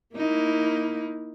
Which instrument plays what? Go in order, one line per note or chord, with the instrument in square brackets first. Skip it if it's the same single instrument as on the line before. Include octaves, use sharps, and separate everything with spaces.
[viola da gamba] A#3 D#4 E4